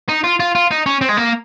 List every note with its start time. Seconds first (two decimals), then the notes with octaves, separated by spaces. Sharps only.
0.09 D#4
0.24 F4
0.40 F4
0.55 F4
0.71 D#4
0.86 C#4
1.01 C4
1.09 G#3
1.17 A#3